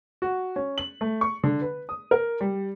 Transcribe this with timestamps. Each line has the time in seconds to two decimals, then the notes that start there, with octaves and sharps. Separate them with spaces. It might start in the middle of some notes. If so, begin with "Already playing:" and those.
0.22 F#4
0.56 C#4
0.78 F#7
1.01 A3
1.21 C#6
1.44 D3
1.61 B4
1.89 D#6
2.11 A#4
2.41 G3